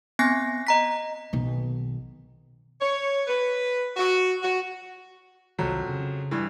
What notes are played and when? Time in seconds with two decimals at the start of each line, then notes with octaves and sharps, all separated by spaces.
0.19 B3 C4 G#5 F#6 A#6 C7
0.67 D#5 A#5 B6
1.33 B1 D#3
2.81 C#5
3.28 B4
3.97 F#4
4.42 F#4
5.59 C2 F2 C3 D#3 F#3
5.89 C#3
6.31 G2 E3